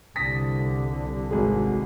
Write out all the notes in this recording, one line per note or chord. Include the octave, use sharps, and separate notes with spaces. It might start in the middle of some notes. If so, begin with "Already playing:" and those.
C2 D3 D#6 A#6 B6
G#1 F#4 G#4